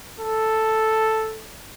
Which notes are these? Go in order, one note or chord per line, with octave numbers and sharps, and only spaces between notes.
A4